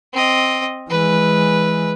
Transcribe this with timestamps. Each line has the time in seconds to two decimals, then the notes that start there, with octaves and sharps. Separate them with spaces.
0.13 C4 D#5
0.89 E3 G#3 B4